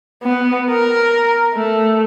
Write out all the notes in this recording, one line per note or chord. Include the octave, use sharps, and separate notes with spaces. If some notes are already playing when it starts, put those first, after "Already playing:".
B3
A#4
A3